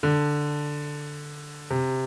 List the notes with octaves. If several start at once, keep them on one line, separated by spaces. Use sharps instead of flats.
D3
C3